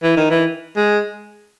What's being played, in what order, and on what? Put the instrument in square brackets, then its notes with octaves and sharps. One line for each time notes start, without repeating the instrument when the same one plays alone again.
[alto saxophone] E3
D#3
E3
G#3